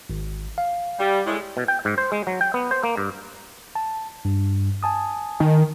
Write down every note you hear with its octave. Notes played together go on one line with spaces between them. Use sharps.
G#1
F5
G3
A2 G#3
B2
G5
G#2
C5
G#3
F#3
G5
B3
C5
A#3
G2
A5
G2
G#5 A5 D#6
D#3